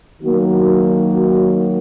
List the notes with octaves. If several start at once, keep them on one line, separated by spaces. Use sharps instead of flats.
D#3 F#3 A#3 F#4